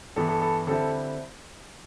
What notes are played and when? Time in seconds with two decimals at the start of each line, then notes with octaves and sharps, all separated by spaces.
0.16 G2 E3 B3 A4
0.29 A4
0.42 A4
0.67 D3 G3 C4 E4 A4